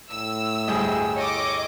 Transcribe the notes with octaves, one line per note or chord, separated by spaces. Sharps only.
A2 E6
D2 G2 C#4 G#4 C5 D#5
E4 A4 C#5 D#5 D6